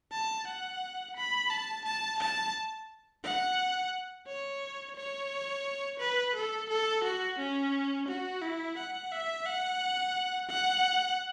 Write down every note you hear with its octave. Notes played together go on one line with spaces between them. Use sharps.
A5
F#5
B5
A5
A5
A5
F#5
C#5
C#5
B4
A4
A4
F#4
C#4
F#4
E4
F#5
E5
F#5
F#5